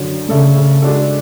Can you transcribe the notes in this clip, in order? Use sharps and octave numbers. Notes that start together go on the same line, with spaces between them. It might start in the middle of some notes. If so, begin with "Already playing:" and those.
Already playing: F#2 D3 F#3 C#4 F#4
C#3 A3 D4 A4 E5
G#3 D4 F#4 A4